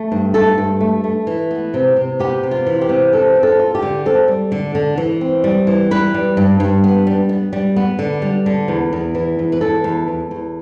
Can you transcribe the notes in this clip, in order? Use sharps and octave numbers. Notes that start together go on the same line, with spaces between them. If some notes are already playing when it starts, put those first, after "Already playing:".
Already playing: A3
G2
A3 A4
G2
A3
A3
E3
B3
C3
C3
B3 G4
C3
F4
E3
G4
C3
C4 A4
C4
A4
F4
G4
D3
C4 A4
G3
D3
D3
E3
C4
G3
E3
G3 B4
G3
G2
G2
B3
G3
B3
G3
B3
D3
G3
D3
E2
E2
E3
E2
B4
E3 A4
E2
E2
E2